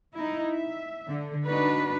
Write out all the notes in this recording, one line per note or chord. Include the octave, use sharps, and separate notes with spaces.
D#4 E4
E5
D3
D4 D#4 F#4 B4